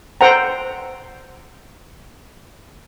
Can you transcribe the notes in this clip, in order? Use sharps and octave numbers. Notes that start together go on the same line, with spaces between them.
A4 C5 F#5 G5 A#5